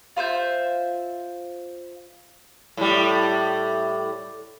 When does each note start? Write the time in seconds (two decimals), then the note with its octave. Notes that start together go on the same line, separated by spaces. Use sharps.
0.17 F4 C5 E5 G6
2.77 A2 G3